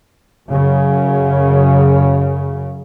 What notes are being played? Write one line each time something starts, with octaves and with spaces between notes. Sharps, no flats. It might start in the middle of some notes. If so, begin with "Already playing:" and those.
F#2 C#3